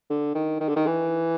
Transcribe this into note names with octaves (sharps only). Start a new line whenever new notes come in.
D3
D#3
D#3
D3
D#3
E3